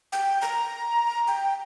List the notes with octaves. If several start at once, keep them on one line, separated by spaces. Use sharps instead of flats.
G5
A#5
G5